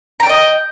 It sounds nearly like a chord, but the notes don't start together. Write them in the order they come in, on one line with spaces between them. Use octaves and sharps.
A#5 G5 D5 D#5